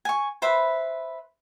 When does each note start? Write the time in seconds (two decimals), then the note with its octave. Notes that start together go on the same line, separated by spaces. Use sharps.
0.05 G#5 C#6
0.42 B4 C5 E5 B5